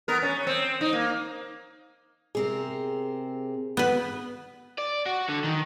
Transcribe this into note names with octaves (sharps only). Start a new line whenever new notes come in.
B3 A#4
C#4
C4
D#4
A#3
C3 C4 G#4 A#4
B3 B4
D5
F#4
D3
D#3